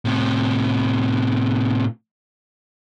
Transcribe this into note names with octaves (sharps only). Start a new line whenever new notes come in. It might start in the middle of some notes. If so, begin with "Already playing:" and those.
A2 C3